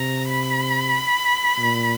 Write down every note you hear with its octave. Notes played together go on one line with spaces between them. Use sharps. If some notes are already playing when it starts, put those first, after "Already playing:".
Already playing: C3 A#5
B5
A#2